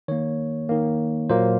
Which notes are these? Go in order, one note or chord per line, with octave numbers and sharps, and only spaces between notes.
D#3 A#3 C#5
D#3 A#3
A#2 F#3 A#3 C5